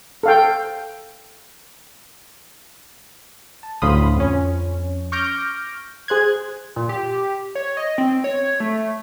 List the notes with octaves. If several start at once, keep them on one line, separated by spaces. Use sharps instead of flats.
A4 F5 G5
A5
D2 A2 F5 B5 C6 D#6
F2 C#4
C#6 D6 F6 G6 A#6 D7
G#4 C5 F#6 G#6
A#2
G4
C#5
D#5
C4
C#5
A3